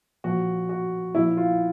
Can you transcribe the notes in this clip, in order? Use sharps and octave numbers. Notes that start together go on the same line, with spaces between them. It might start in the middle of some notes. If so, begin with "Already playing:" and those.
A#2 F3 F#4
F#4
A#2 F3 E4
F4